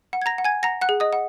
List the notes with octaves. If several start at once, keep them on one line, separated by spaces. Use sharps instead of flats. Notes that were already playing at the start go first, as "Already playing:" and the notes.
F#5
G#6
A#5 A#6
F#5
G#5 G#6
F#5 A#5 A#6
F#5 F#6
G#4
D#5 D#6
F#5